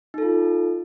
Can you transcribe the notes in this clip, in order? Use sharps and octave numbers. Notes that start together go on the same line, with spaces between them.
D#4 F4 A4